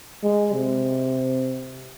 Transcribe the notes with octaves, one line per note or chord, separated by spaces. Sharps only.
G#3
C3